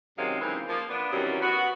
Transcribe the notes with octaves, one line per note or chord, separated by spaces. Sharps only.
F#2 C3 D#3 F#3 G#3 F5
C#3 E3 G#3 A#3 C4 D#4
F3 A#3
B3 D4
F#2 C3 D#3 E3 F#3 G3
B3 F#4